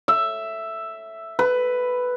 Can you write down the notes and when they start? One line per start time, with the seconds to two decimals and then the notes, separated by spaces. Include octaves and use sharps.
0.08 E5
1.39 B4